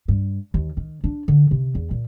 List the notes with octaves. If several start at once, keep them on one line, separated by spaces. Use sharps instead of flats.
G2
D#2
D#3
D4
D3
C3
E2
A#2